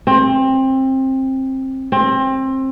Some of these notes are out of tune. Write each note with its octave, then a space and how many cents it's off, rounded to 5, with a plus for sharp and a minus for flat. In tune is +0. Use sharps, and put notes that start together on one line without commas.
C4 +20
C4 +25